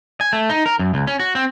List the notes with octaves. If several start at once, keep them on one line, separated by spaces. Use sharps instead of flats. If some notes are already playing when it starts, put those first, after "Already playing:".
G#5
A3
D#4
A#4
F#2
C#2
C#4
F#4
C4